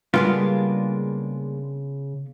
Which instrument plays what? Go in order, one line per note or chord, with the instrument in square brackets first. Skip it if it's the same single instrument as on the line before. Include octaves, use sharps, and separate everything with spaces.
[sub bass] C#3 [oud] G3 G#3 A#3 [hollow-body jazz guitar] B3 D4 F4